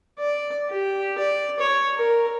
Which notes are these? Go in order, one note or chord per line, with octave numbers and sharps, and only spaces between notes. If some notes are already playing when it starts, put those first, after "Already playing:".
D5
G4
D5
C#5
A#4